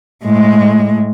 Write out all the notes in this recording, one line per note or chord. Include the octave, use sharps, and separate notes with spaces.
A2 G#3